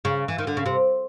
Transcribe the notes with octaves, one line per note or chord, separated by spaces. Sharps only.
C#3
E3
D#3
D3
C#3
C3